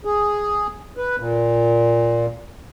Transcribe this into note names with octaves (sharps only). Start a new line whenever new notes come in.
G#4
B4
A#2